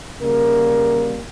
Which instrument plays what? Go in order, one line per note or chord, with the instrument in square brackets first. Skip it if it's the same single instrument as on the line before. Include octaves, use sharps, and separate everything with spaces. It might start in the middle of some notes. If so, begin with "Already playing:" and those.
[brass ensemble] C#3 G3 A#3 A#4